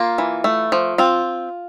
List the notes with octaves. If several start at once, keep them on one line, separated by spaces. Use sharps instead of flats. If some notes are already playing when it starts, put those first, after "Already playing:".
Already playing: A#3 F4
E3
A3
F3
C4 F4